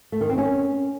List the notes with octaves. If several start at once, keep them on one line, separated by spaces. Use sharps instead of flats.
A3
D#3
C4
C#4